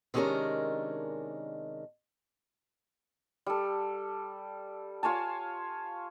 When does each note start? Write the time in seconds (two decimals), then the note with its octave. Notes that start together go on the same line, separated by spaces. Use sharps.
0.14 C3 D#3 G#3 C#4 D4 A#4
3.46 G3 A4
5.03 F4 C#5 G#5 A5